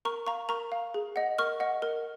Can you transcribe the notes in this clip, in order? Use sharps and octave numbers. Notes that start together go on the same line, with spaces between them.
A#4 A#5 C#6
F5 A#5 C#6
A#4 A#5 C#6
F5
G#4
D#5 F#5
A#4 C#6 F6
D#5 F#5
A#4